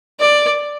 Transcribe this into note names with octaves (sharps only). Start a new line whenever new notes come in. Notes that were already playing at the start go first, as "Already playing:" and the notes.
D5